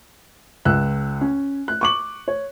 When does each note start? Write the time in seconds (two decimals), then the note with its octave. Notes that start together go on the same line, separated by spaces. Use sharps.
0.65 C#2 E6 F#6
1.21 C#4
1.68 F#6
1.81 C#6 D6 F#7
2.28 C#5